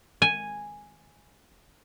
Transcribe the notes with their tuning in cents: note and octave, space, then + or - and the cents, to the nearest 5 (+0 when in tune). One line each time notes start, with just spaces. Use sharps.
G#5 -5